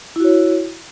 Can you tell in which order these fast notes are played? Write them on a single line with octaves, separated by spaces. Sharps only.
E4 F#4 C#5